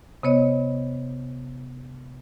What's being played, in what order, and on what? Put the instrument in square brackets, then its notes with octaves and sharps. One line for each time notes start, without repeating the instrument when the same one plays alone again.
[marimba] C3 B3 C#5 D#5